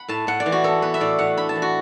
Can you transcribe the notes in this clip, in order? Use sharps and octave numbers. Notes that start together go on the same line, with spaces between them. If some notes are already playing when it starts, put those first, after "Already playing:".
Already playing: F#5 B5
A2 A5
A2 F#5
D5
E3
F#4
B3 A4
B3 B4
E5
A2 D5
A2 F#5
D4 B5
A5
E3
F#4